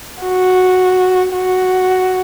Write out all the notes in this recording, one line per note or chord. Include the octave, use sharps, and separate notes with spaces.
F#4
F#4